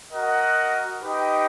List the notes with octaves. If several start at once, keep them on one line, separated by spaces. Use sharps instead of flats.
F#4 A#4 D#5 F#5
D#4 G4 B4 D#5 G5